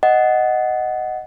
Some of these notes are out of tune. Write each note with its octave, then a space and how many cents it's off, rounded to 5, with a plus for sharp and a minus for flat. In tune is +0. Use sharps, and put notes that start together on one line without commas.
D#5 +0 F#5 +5